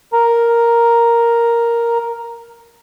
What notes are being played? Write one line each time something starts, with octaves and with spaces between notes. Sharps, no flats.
A#4 A#5